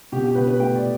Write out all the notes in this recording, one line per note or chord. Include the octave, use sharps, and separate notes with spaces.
B2 G4
G4
B2 B4
B4
A3 G5
D5